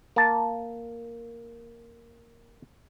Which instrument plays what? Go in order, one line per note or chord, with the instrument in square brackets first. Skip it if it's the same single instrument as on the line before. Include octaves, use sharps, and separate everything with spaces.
[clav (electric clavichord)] A#3 A5